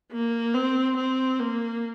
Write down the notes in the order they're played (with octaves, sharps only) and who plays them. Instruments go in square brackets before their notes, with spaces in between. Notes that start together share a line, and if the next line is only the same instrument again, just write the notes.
[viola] A#3
C4
C4
A#3